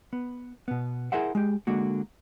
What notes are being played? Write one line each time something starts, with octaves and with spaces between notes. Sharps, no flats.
B3
B2 B3
E4 G#4 A#4 C5 E5 F#5
G#3 G4
D3 G#3 A#3 F#4